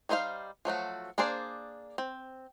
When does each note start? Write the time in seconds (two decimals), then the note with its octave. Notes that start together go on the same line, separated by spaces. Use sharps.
0.09 G3 D#4 C5 E5 F5
0.65 F3 F#3 A3 F#4
1.18 A#3 D4 G#4 C5 D5
1.98 C4